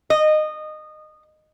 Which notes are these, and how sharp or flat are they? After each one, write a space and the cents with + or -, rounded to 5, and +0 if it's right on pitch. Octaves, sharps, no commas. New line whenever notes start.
D#5 -20